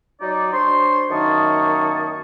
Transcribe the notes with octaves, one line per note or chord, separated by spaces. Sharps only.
F#3 D#4 D5
D4 C5 C#5 C6
F#2 D#3 A#3 A5 C#6 D#6